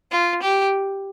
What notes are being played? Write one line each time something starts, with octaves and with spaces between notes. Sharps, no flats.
F4
G4